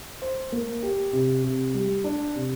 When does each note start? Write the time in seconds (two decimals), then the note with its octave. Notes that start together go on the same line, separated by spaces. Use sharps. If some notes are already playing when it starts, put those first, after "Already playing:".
0.22 C5
0.52 A#3
0.83 G4
1.13 C3
1.44 C3
1.74 G3
2.04 D4
2.36 C3